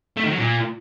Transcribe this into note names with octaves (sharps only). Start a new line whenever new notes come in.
A3
D#3
F#3
A#2